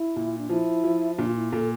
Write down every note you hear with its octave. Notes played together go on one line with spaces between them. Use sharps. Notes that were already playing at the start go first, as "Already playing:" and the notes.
Already playing: E4
A#2
D4
F3 E4
F3
A#2 D4
F4
E4
A#2 A4